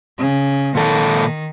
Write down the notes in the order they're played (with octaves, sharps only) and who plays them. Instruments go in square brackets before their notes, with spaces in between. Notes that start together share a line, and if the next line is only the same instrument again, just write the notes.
[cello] C#3
[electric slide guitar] A#2 A4 F5 [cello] D#3